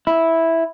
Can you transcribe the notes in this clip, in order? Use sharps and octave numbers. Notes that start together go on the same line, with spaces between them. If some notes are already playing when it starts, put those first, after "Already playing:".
E4